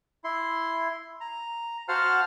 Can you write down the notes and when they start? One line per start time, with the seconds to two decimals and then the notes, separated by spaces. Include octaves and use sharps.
0.24 E4 C6
1.21 A#5
1.88 F#4 C5 F5 F#5 A5 F6